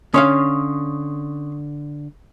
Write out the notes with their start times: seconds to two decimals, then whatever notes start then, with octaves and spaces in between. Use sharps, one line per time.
0.14 D3 C#4 C#5 F5 C6 C#6 D#6